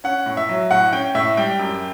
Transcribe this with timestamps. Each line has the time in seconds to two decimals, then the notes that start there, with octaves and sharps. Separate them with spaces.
0.04 C#4 F#5
0.26 A2
0.37 E5
0.49 F#3
0.71 A2 F#5
0.93 C#4 G5
1.15 A2 E5
1.37 G3 G5
1.59 F#2